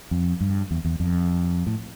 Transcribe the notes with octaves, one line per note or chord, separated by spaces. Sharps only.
F2
G2
E2
E2
F2
A2